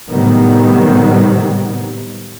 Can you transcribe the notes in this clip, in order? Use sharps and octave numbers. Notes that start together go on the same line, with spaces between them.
A2 C3 D#3 F#3 G3 B3